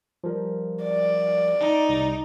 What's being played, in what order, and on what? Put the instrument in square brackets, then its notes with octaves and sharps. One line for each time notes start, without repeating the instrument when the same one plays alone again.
[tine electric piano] F3 G3 A#4
[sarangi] D5
[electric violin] D#4
[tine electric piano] C2